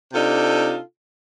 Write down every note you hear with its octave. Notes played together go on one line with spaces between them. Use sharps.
C3 D4 D#4 F4 A4